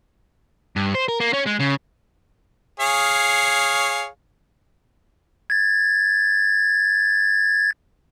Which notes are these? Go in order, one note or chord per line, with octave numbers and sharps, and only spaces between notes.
G2
C5
A#4
A#3
C#4
G#3
C#3
G#4 C#5 F5
G#6 A6